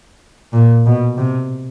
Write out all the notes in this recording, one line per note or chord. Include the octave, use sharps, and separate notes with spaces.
A#2
B2
C3